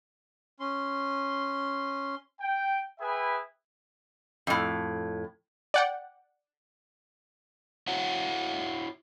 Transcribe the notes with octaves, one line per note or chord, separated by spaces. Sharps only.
C#4 C6
G5
G#4 B4 E5 G5 G#5 B5
F2 A2
D5 F#5 G5
E4 F#4 C#5 E5 F#5